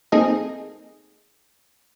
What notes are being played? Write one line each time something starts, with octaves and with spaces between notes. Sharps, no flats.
A#3 C4 D#4 G#4 A4 D#5